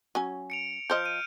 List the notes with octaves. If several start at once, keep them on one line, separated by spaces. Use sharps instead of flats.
F#3 C#4 G#5
C#7 D7 F7
F3 C5 D#5 F6 G6
D#7